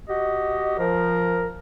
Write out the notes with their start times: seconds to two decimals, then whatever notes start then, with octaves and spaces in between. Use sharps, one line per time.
0.09 F#4 G4 D#5
0.79 F3 A#4